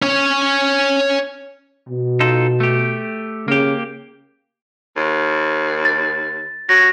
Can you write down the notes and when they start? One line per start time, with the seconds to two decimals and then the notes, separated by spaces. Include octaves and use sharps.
0.02 C#4 C#5
1.89 B2
2.20 D#4 F4 A4
2.60 A3 G4
3.48 C#3 A#3 G4
4.97 D#2
5.85 A6
6.69 F#3 A#6